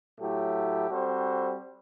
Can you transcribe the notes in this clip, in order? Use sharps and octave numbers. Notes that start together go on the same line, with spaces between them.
A2 F#3 A3 E4 G4
G3 C4 F#4 A4 C5